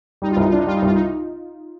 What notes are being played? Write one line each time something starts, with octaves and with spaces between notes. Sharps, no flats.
G3 D#4
F4
C2 D#4
D4 F4
D#4
G3 F4
D#4
C2 F4
D#4